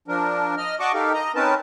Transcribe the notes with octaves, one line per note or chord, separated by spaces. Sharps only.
F3 D4 A#4
D#5 F6
F#4 D5 D#5 A5 C#6 D6
D#4 G4 A4 A#4 F5
D#5 A#5
C4 C#4 D#4 A#4 B4 A5